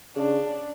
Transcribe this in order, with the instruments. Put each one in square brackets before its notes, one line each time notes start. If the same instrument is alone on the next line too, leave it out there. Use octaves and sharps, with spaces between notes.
[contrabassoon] C#3 [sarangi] D4